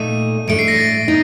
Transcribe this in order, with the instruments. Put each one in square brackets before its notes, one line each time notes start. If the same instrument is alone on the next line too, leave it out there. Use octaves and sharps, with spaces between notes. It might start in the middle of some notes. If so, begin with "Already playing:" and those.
Already playing: [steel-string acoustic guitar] A#2 A3 D#4 [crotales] D#7
[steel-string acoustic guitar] A2 A3 D4 [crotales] D7
[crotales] C7
A#6
A6
[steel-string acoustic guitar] D#4